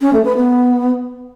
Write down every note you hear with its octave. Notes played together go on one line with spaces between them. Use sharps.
C#4
A3
B4
B3